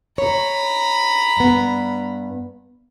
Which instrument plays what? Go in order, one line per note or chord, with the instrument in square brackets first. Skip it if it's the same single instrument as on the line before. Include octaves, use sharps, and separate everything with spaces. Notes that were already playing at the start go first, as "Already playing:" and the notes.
[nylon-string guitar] C#5 [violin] A#5 B5
[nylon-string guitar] G2 B3